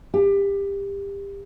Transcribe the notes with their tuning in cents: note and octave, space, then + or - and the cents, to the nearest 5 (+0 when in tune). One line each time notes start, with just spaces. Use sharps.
G4 +25